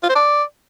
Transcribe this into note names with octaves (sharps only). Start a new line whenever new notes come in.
F4
C5
D5